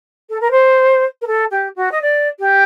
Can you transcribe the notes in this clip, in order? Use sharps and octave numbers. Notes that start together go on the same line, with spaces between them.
A4
A#4
C5
A#4
A4
G4
F#4
D#5
D5
G4